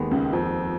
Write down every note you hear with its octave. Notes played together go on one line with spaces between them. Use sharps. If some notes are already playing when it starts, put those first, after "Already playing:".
Already playing: D#2 D#3 G#3 B3
C#2 C#3
F2 F3